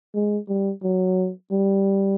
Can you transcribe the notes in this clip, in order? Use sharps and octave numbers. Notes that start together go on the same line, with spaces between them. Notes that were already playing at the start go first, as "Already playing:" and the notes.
G#3
G3
F#3
G3